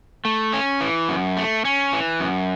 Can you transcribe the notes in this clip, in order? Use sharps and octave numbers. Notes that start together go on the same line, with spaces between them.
A3
C#4
E3
F#2
A3
C#4
E3
F#2